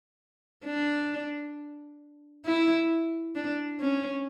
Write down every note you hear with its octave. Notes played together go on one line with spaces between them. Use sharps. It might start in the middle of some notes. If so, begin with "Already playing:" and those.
D4
E4
D4
C#4